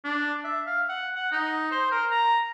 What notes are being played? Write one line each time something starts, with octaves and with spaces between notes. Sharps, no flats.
D4
E5
F5
F#5
F#5
D#4
C5
A#4
A#5